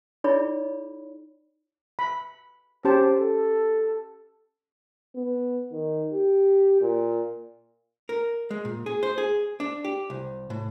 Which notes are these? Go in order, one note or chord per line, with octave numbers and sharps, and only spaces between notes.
D#4 E4 G#4 C#5 D5 B5
B5
C#4 G4 C5 A5
A4
B3
D#3
G4
A#2
A#4
G#3
A#2
G#4
C5
G#4
D4
G4
C2
A2